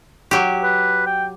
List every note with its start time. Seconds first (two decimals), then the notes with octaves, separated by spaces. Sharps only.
0.31 F#3 G4
0.63 B4
1.06 G5